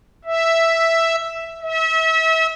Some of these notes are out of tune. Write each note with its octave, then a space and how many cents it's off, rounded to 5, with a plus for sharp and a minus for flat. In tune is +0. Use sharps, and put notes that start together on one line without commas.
E5 +0
E5 -35